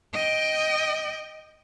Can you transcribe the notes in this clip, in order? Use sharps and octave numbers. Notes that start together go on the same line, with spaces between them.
D#5 G5